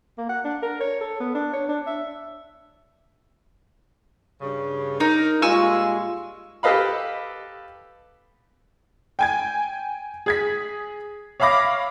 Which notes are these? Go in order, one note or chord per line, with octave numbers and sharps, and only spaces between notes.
A#3
F#5
D4
A#4
C#5
A4
B3
D4
C#5
D4
E5
G2 C#3
D#4 A#4
A#2 G3 G#3 F4 G#5 C#6 E6
G4 A4 B4 D#5 F5 B5
G5 G#5 G#6
G#4 G#6 B6
C#5 E5 F5 B5 D6 A#6